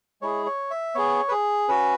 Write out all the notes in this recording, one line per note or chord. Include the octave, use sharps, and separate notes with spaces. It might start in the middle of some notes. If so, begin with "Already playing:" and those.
G#3 E4 G#4 C#5
C#5
E5
B3 G#4 C#5
B4
G#4
C#4 F#4 B4